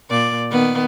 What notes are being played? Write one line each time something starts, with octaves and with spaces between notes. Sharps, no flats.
A#2 D5
D#3 B3